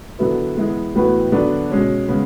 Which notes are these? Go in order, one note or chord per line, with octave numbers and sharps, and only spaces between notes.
D3 F#3 B3 E4 B4
E3 G#3 B3 E4
A2 E3 B3 F#4 B4
D3 F#3 B3 D4 F#4
B2 G#3 C#4
C#3 G#3 B3